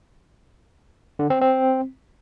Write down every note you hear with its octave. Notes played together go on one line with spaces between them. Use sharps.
D3
C4
C4